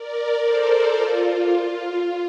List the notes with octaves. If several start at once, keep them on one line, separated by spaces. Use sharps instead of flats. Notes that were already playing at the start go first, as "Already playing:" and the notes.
Already playing: A#4 D5
A4 C5
F4
F4